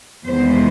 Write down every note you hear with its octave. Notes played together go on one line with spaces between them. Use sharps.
E2 C3 D#3 G#3 B3 C5